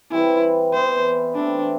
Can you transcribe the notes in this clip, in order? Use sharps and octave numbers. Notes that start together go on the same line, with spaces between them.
E3 G3 C4 E4 G4
E3 B3 E4 C5
E3 A3 C4 D4 E4